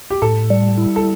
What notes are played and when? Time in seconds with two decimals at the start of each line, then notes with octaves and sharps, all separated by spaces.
0.10 G4
0.22 A2 A4
0.50 G3
0.78 E4
0.96 A4